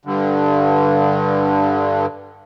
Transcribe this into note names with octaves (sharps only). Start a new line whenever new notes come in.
G2 D3